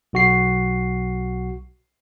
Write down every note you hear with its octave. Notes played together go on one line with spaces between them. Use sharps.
B1 F#4 C7